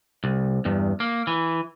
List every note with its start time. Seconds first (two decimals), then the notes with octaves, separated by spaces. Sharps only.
0.24 C2
0.65 E2 G2
1.00 A#3
1.27 E3